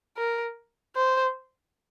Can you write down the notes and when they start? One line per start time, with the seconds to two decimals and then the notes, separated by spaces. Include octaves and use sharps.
0.17 A#4
0.96 C5